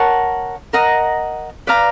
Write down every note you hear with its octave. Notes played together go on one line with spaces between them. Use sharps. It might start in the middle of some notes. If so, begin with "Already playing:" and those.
Already playing: A#4 C#5 F#5 A5
A#4 D#5 F#5 A#5
B4 D5 F5 A#5